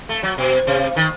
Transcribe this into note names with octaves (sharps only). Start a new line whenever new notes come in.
A3
F#3
B2
C3
D#3